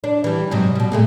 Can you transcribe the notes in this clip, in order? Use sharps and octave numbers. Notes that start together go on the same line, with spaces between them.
D4
E3 G3
G#2 C3 F#3
B2 G3
A#2 G#3 A3